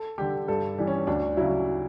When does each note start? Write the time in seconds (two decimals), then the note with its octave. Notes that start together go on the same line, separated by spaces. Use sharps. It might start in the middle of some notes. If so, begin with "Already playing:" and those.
Already playing: A4
0.18 D3 G3 G4
0.48 G2 A4
0.78 E3 G3
0.87 C#4
1.07 D2 D4
1.37 C#3 F#3 E4